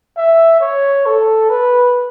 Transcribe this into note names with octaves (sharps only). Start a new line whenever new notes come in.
E5
C#5
A4
B4